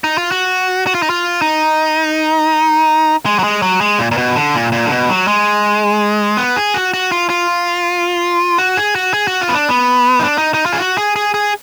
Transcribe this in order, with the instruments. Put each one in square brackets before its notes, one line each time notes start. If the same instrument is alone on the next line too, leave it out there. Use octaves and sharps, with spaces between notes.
[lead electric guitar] D#4
F4
F#4
F#4
F4
D#4
F4
D#4
G#3
F#3
G#3
F#3
G#3
A#2
A#2
B2
D3
A#2
A#2
D3
B2
F#3
G#3
B3
G#4
F#4
F#4
F4
F4
F#4
G#4
F#4
G#4
F#4
F4
B3
D4
B3
D#4
D4
D#4
D#4
F4
G#4
F#4
G#4
G#4
G#4